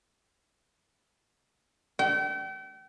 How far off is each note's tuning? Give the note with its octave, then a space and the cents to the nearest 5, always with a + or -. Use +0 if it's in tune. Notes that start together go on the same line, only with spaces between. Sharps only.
G5 -40